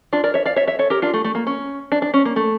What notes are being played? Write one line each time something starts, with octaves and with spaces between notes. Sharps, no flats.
D4 F4
A#4 D5
C#5 E5
D5 F5
C#5 E5
C#5 E5
A4 C#5
G4 A#4
D4 F4
A3
A3
A#3
C#4
D4
D4
C#4
A#3
A3